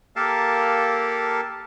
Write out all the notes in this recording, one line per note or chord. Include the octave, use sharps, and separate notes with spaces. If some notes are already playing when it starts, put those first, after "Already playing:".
A#3 G4 A4 A#4 F5 A5